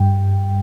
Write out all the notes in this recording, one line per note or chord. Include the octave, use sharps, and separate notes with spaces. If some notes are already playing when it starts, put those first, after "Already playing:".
Already playing: G2 G3 G5